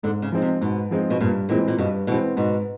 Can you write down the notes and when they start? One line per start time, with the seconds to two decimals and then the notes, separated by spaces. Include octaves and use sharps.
0.03 G#2 D3
0.22 C#3
0.32 F3 G#3 C4 D#4
0.42 C3
0.61 G#2 B2
0.91 F3 G#3 C4 D#4
1.10 B2
1.21 G2 A#2
1.49 A#2 E3 G#3 C4
1.68 A#2
1.78 G2 B2
2.07 B2 E3 G#3 C4
2.37 G#2 B2